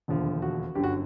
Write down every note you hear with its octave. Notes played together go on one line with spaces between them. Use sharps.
E1 D#2 D3 F3
F#4
G1 F#2 D3 G4
F#4